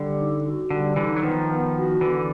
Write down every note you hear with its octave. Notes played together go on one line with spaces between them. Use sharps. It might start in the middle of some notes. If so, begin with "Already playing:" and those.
Already playing: D3 G3
D#4
F#4
D3 G3
D3 E3 D#4
F#3
D#3 F3 B3
B3
F#4
D3 E3 B3